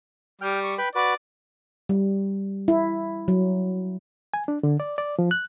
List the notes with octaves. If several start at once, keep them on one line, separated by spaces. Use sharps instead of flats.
G3 G5 F6
C#6
B4 G5 B5
F#4 B4 D5
G3
E4
F#3
G#5
D4
D3
D5
D5
F3
F#6